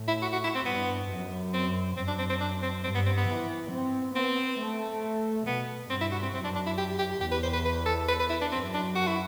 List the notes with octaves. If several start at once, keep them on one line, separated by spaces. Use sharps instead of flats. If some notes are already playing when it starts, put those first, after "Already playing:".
Already playing: A2
E4
F#4
F#4
E4
C4
G2 B3
F#2
C4
F#2 C4
D4
C4
C4
D4
C4
G2 C4
B3
C4
B3
E3
C4
B3 C4
A3
B2 B3
G2 C4
E4
F#4
C4
F#2 C4
D4
D4
E4
G4
G4
E2 G4
B4
C5
B4
B4
A4
B4
B4
E4
D4
F#2 C4
D4
F#4
E4